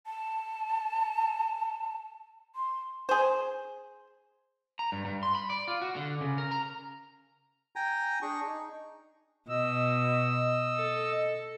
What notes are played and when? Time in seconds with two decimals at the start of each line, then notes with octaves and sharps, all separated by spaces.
0.06 A5
2.55 C6
3.09 G#4 C5
4.79 A#5
4.92 G2
5.05 G2
5.23 C6
5.35 B5
5.50 D5
5.68 F4
5.82 F#4
5.96 D3
6.21 C#3
6.38 A#4
6.51 A#5
7.76 G5 G#5 A#5
8.22 D4 G#4 C#6
8.47 D#4
9.49 B2 D#5 E6
10.76 A4